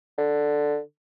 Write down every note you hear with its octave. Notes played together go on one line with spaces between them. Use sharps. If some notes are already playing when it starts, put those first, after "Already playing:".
D3